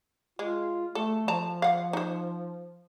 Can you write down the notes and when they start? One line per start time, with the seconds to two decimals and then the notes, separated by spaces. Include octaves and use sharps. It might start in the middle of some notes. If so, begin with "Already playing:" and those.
0.39 G#3 F4
0.95 A3 A4
1.28 F3 A5 A#5
1.62 F5 F#5
1.93 D#4 C5